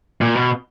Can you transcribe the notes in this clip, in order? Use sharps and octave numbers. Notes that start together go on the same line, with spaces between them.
A#2
B2